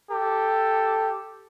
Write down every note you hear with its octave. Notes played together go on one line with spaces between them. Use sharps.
G4 A4